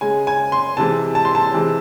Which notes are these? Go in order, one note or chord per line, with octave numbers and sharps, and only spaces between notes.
C#3 G#3 G#5
G#5
C6
C3 E3 G#3 A5
A5
C6
A5
C3 E3 G#3